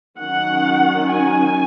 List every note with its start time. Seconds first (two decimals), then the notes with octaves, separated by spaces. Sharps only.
0.19 D#3 F#3 C#4 F#5
1.11 G#5